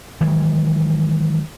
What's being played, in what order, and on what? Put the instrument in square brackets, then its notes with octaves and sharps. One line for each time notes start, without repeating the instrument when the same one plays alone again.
[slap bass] D#3 E3 F#3 G#3